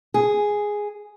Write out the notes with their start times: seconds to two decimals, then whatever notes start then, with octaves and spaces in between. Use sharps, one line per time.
0.14 G#4